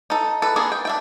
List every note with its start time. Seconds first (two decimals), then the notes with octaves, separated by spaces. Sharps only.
0.10 D#4 A4
0.42 A4 B4
0.56 A#3 B3 D4 G#4 A4
0.72 G5
0.85 D4 E5 G5